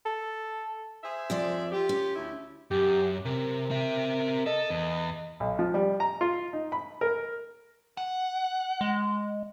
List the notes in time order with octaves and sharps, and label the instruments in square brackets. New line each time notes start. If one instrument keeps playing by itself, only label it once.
[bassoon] A4
[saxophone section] G#4 C5 E5
[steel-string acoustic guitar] F2 F3 D5
[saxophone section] F4 G4
[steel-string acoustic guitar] C#4
[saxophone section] D2 E4
[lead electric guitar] F#2 [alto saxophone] G4
[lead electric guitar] C3 [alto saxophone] A#4
[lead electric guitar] C4 E5
[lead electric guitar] A4 [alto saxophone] D#5
[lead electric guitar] E2
[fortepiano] B1
F3
G3
A#5
F4
D#4
B5
A#4
[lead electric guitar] F#5
[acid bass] G#3